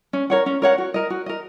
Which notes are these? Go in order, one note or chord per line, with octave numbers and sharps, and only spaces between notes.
C#4
A#4 C#5 F#5
C#4
A#4 C#5 F#5
F#4
A#4 D#5
F#4
A#4 D#5